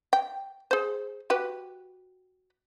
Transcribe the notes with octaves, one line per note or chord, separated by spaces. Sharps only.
G5
G#4 C5
F#4 G4 B4